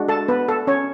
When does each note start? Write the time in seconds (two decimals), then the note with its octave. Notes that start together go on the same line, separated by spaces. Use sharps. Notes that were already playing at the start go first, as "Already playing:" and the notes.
Already playing: G#3 D4 F#4
0.09 A4 A5
0.28 B3 B4
0.49 A4
0.67 C#4 C#5